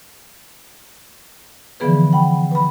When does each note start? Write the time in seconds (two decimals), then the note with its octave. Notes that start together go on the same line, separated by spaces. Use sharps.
1.80 D3 E3 F3 B3 G#4 B4
2.13 F#5 G5 B5
2.51 B4 B5